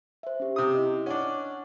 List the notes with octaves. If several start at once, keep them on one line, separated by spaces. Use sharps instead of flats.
C5 E5
C#4 G4
C3 D#6
E4 D#5
C#4 D4 D#5 F#5